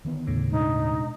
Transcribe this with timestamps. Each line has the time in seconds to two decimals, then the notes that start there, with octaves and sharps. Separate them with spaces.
0.05 D3 D#3 B3
0.27 D#2 A2 C#3
0.51 B2 G#3 D4 D#4